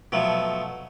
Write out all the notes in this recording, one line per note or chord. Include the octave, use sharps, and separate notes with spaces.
B2 F3 F#3 A3